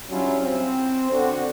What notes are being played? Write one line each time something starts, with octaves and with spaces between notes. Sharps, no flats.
F#3 G3 C#4 D4 E4 F4
C4
D3 F#4